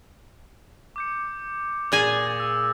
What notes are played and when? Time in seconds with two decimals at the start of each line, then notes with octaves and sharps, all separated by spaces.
0.96 D6 G6 C#7
1.92 A#2 G#4 G#5 D6 A6 A#6
2.40 E6